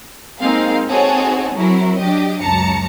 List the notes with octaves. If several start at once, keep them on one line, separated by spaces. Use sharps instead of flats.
G#3 A#3 C4 D#4 G#4 F5
C4 D#4 F#4 G#4 A4 C#5
F#3 C4 E4 A#4
F#3 D4 G4 D#5
C#2 F#2 A5 A#5 C#7